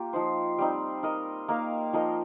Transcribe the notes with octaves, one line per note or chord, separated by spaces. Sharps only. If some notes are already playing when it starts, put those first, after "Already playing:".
Already playing: A#3 F4 G4
F3 D#4 C5
G3 C4 D#4
D#4 A#4 D#5
A#3 D#4 A#4 F5
F3 D#4 A#4 D#5